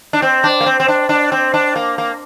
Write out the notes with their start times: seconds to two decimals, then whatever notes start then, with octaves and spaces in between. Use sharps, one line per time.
0.13 D4
0.22 C4
0.44 D4
0.60 A#3
0.66 C4
0.80 C4
0.88 D4
1.09 D4
1.32 C4
1.54 D4
1.76 A#3
1.98 A#3